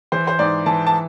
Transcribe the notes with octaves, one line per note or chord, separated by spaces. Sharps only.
E3 C5
C5
G#2 D5
E3 A5
A5